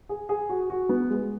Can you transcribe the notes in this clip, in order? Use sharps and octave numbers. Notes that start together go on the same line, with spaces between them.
G#4
G#4
F#4
F#4
B3
G#3